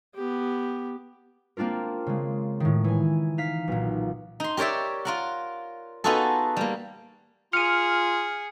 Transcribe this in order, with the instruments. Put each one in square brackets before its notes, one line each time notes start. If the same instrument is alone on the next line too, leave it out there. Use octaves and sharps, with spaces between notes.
[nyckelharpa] B3 G4
[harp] A#3 C4 D4 F4 A#4
C#3 G#3
A2 D#3
E3 G#5
D#4 F5 B6
B1 A#2
[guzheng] D#4 C6
G4 A#4 C#5 D5 E5
F4 A#4 F#5
B3 D#4 F4 F#4 G#4 A4
G3 A#3
[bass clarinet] F4 [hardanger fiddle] G#4 [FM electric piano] F6 [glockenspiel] C#7 D#7